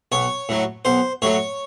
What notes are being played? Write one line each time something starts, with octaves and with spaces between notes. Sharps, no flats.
B1 C#5
A2 F#3
B1 C5
A2 F#3 C#5